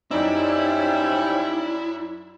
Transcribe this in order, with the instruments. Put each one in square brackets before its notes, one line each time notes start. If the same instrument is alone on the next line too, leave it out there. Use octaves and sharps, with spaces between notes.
[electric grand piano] F#2 D5 E6 [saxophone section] G3 C4 C#4 [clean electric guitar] D#4 [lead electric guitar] E4